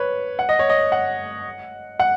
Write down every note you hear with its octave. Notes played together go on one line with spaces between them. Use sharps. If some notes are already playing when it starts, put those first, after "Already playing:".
Already playing: B4 C#5
F#5
D#5
C#5
D#5
F#5
F#5